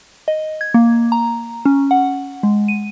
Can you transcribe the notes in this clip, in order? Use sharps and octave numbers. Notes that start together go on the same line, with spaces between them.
D#5
G#6
A#3
A#5
C#4
F#5
G#3
D#7